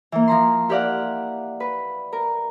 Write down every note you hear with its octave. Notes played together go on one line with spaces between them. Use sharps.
E3 A#3
F3 A#5 C6
E4 G4 A#4 D5 F5 F#5
B4
A#4